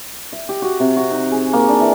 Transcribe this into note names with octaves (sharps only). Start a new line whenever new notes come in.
E5
G4
F#4
C3
F#4
D#4
G#4
A#3
D4
E3